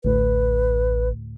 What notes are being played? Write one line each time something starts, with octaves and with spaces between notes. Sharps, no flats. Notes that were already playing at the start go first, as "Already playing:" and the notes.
A1 D2 A2 B4